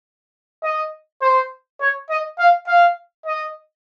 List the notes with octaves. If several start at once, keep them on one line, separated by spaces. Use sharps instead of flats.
D#5
C5
C#5
D#5
F5
F5
D#5